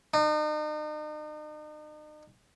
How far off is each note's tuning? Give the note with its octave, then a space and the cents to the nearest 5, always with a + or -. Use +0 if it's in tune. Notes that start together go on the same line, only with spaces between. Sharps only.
D#4 -40